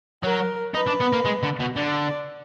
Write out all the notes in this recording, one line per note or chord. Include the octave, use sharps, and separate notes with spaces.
F#3 A#4
D#4 B4
D4
B3
A#3
G#3
D3
B2
D3 D5